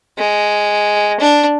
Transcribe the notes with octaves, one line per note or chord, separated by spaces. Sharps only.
G#3
D4